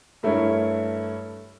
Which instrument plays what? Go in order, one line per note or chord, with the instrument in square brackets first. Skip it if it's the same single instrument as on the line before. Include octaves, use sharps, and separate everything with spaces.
[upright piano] G2 A3 E4 A#4 C#5